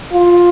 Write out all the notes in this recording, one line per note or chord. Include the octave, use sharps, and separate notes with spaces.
F4